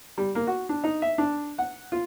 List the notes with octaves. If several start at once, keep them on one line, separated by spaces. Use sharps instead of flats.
G3
A#3
F#4
D4
D#4
E5
D4
F#5
F4